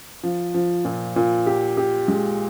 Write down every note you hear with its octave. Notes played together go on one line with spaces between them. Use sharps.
F3
F3
A#2
A#2
G4
G4
G#3